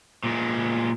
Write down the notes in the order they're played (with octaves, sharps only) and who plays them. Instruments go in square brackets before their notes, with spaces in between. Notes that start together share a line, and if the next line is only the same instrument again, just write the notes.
[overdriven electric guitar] A#2 G#3